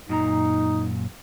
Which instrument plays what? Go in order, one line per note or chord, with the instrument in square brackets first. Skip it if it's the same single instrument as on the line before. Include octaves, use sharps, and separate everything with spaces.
[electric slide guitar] F#2 A#2 A#5 [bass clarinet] D#4